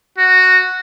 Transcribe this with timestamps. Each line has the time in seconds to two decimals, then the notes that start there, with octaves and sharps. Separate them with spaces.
0.18 F#4